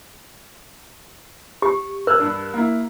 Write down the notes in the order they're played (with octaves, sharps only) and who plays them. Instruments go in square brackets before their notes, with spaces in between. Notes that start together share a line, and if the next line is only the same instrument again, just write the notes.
[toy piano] G4 [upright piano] C#6
[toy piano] A#4 [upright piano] F6 F#6 G#6
[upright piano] G2 D4
A#3 E4